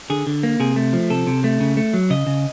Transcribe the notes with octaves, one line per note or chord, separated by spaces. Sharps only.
D3 G#4
D3
A#3
C3 G#4
A3
F3
C3 A4
C3
A3
C#3
A3
F#3
C#3 D#5
C#3